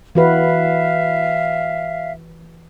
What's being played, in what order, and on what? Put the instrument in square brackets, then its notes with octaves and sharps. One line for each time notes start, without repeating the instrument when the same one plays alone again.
[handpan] E3 F#4 B4 [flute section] E5 F5